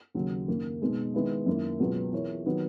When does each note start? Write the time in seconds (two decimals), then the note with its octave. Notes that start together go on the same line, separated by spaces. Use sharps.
0.14 D#2 C#3 F#3
0.48 F#2 D#3 A#3
0.82 B2 G#3 D#4
1.14 D#3 G#3 B3 E4
1.46 F#2 D#3 A#3 E4
1.80 C#2 B2 F#3 B3
2.12 E3 B3 E4 A#4 C#5
2.46 D#3 F#3 B3